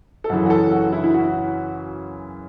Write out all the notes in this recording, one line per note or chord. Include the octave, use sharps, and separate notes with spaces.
A4
F#2 C#3 E3 F#4
F#4
A4
F#4
E4
E4
F#4